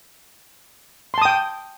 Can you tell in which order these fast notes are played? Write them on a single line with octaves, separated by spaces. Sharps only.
C6 A5 D#6 G5